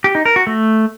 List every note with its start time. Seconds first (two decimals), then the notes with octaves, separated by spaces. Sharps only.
0.04 G4
0.15 D#4
0.25 A#4
0.36 F#4
0.47 A3